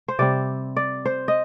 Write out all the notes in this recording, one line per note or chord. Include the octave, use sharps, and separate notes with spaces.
C5
C3 G3 C4 D5
D5
C5
D#5